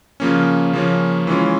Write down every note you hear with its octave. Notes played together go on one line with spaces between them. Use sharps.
C#3 F3 A#3 C#4
C#3 F3 A#3 C#4
E3 G#3 C#4 F4